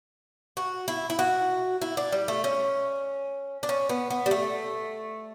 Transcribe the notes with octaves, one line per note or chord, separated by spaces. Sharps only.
F#4
E4
E4
F#4
E4
D4
G3
A3
C#4
D4
C#4
B3
B3
G3
A3